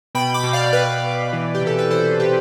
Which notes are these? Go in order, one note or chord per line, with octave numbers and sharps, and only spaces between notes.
B2 G5 B5
B5 D6
B2
D5 F5
B2 B4 D5
B2
E3
G4
C3
A4
B4
E3 A4 C5
C3 G4 B4